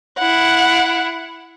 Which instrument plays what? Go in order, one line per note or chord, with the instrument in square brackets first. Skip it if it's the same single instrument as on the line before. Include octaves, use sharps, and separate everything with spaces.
[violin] E4 F#5